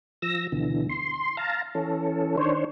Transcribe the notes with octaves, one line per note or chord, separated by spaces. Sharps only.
F3 E6 A#6
D2 B2 D3 E3
C6
F5 A5 A#5
E3 C#4 A4
D#3 D4 C5 C#5